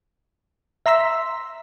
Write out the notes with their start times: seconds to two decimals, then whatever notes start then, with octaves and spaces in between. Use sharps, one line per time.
0.86 E5 A#5 C6 E6 B6